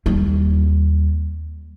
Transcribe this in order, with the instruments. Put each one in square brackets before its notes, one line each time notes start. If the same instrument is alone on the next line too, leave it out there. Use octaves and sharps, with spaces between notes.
[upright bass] D#2 G3